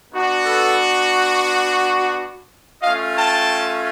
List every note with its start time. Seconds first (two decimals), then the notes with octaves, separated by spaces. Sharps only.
0.12 B3 D4 F#4
0.45 A4 B4
2.82 A3 C#4 F4 D#5 F5
3.16 G5 A5